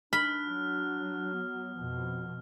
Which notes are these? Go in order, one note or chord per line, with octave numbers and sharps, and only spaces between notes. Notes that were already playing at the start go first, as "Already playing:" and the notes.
D4 B5 F6
F#3
B3
F2 B2 F3